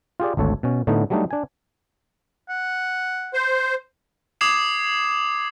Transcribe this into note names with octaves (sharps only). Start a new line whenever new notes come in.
F4 G4 G#4 D5
G#1 D2 A4 C#5
B2 C#4
A2 D3 A3 B3 D#4
F#3 G3 A3 D4 D#4
D4 G#5
F#5
C5
D6 D#6 G#6 C7 E7